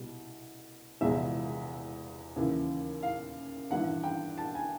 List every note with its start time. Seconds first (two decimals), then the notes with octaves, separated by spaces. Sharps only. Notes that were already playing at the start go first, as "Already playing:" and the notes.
Already playing: C2 B2 G3
1.01 E1 E2 C3 F3 G#3 E5
2.36 D#2 C#3 E3
3.03 F5
3.71 G#1 G2 E3 F#5
4.03 G5
4.38 A5
4.55 G#5